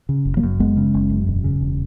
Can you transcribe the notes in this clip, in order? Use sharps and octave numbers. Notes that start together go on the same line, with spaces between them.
C#3
F#1
F#3 A#3
F#2
F#1 G#3 B3
C#3
F#1
F#2
E1
C#3
E1